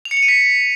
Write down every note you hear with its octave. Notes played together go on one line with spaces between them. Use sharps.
F7
C#7
F7
D#7
B6